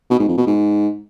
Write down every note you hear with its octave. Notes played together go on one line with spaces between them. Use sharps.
B2
G#2
F2
B2
G#2